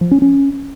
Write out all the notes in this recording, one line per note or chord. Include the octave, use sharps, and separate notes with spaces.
F3
C#4
C#4